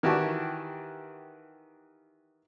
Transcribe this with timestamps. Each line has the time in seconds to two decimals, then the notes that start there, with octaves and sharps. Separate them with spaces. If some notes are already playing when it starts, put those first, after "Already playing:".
0.03 D#3 E3 F#4 G4 A5